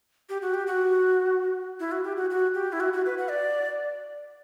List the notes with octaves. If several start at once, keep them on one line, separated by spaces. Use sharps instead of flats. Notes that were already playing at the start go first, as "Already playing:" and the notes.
G4
F#4
G4
F#4
E4
F#4
G4
F#4
F#4
G4
E4
F#4
F#4
B4
F#5
D5